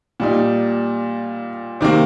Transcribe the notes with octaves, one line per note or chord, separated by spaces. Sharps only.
A#2 G3 D#4
C3 D#3 A#3